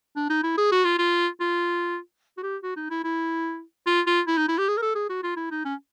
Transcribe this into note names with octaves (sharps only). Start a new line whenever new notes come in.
D4
D#4
E4
G#4
F#4
F4
F4
F4
F#4
G4
F#4
D#4
E4
E4
F4
F4
E4
D#4
E4
G4
G#4
A#4
A4
G#4
F#4
F4
E4
D#4
C#4